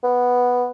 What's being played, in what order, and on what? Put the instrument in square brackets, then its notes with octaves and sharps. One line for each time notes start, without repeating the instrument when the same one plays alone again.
[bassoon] B3